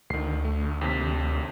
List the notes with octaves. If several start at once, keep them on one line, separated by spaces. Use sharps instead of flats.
D2 D#3 C7
A3
D#2 C3 B6